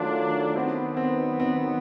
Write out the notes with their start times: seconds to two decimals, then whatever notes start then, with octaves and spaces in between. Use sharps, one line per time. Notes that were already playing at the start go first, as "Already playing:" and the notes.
Already playing: D#3 F#3 A3 D4 F4
0.55 D#3 F#3 B3 C4
0.97 C4
1.40 C4